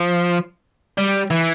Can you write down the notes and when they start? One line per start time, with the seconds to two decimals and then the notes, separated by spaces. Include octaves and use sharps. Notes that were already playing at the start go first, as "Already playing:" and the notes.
Already playing: F3
0.98 G3
1.31 E3